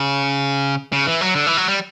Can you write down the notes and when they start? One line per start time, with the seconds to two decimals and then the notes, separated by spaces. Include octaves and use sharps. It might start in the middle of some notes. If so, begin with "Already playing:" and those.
Already playing: C#3
0.93 C#3
1.07 E3
1.21 F#3
1.35 D3
1.46 E3
1.57 F#3
1.68 G3